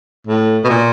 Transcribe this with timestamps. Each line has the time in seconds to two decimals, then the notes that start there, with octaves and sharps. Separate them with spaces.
0.27 A2
0.64 B2
0.69 A#2